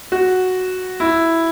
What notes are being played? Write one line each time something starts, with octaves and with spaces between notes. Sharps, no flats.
F#4
E4